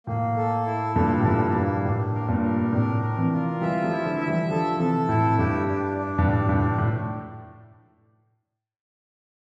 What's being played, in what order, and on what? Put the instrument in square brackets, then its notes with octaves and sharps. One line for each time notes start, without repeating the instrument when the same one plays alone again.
[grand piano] A2 [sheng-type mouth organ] A#3
[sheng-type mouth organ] A4
E4
[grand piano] G2 A#2 [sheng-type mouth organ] A4
[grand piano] A2
[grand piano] G2 A#2 [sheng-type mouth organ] E4
[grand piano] G2 [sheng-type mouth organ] A#3
[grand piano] A2 [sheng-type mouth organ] D4
[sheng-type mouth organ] A#4
[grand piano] G2 A#2
[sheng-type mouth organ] A#4
[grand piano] A2 C3 [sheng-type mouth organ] D4
[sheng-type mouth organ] A#4
[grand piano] C3 E3
[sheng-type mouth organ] F4
[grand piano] E3 G3 [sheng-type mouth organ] E5
[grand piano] F3 A3
[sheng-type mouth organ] E4
[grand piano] D3 F3
[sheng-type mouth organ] E5
[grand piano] E3 G3
[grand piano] D3 F3 [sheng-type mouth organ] A4
[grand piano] F3
[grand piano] C3 E3 [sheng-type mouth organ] A4
[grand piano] A2 [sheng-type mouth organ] E4
[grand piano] G2 [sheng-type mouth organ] G4
[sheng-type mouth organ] D4
D4
[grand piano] G2
[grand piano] A2 [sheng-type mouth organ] D4
[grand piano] G2
[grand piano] A2 [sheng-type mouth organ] D4
[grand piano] A2